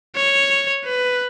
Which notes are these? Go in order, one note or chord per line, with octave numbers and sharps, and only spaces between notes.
C#5
B4